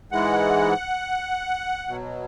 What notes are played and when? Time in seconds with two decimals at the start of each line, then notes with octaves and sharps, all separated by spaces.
0.12 G#2 E3 G#3 F#5
1.88 B2 F#3